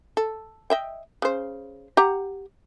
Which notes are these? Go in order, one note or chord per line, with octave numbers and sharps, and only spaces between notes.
A4
D#5 E5 G5
C#3 C5
G4 F#5 A#5